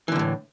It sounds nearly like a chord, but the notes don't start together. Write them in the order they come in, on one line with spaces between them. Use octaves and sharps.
E3 D3 E2 A2